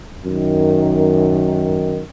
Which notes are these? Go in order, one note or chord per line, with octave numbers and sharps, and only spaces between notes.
F#2 D#3